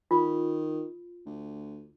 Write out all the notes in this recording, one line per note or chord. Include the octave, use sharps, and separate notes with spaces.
D#3 F4
D2